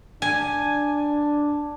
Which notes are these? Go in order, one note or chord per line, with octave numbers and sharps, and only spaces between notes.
D4 G#5